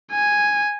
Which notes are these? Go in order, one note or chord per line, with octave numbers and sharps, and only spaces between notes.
G#5